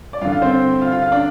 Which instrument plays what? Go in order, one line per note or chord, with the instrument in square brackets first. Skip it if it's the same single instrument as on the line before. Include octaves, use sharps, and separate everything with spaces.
[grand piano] D5
G2 F4 F5
D3
F4 F5
C4 C5
F4 F5
F4 F5
F4 F5
D4 D5